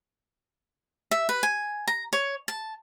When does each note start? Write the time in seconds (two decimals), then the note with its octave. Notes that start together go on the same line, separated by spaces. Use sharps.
1.11 E5
1.29 B4
1.43 G#5
1.88 A#5
2.13 C#5
2.48 A5